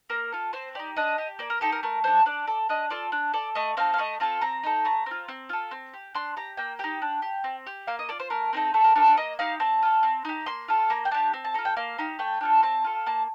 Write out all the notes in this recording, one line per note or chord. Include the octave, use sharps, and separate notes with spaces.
A#3 A#4
F4 A4
C4 C5
D#4 G4 D5
D4 D#5
G4
A#3 D5
A#4
D#4 G4 A4
A#4
A3 A#4
D4 A4 C5
D4 D5
A4
D4 D#5
F4 A4 D5
D4
A4 D5
A3 D#5
C4 D#4 A4 F5
F5
A3 D#5
C4 F4 A4 A5
C4 A#5
D#4 A4
A3 A#5
C4 F4
C4
F4 A4
C4
G4
D4 C6
G4 A#5
A#3 G5
D#4 G4 G5
D4
G4
C4
G4
A#3 F5
D#5
F4 A4 D5
C5
A3 A#4
C4 D#4 A4
A3 A4
A#4
D4 F4 A4 A#4
D5
A#3 D#5
D#4 G4 F5
C4 A5
F4 A4
C4
D#4 G4
A#3 C6
F4 A4
A#3 A#5
G5
D4 G4 A5
C4
A5
F4 A4 A#5
G5
A#3 F5
D#4 G4
A3 G5
D4 F4 A4
C4 A5
F4 A4
A#3 A5